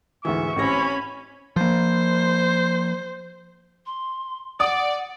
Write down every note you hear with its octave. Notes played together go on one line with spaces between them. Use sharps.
D2 G#2 E3 E5 C#6
A1 C4 C#4 B5 A#6
F3 A#3 C5
C6
D5 F#5 D#6